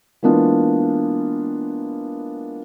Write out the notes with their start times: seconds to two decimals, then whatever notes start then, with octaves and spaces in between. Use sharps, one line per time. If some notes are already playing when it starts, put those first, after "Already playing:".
0.23 E3 G#3 A#3 B3 D4 F4